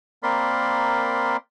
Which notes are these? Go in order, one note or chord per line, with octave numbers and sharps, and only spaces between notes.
A#3 C4 A#4 D5 B5 C6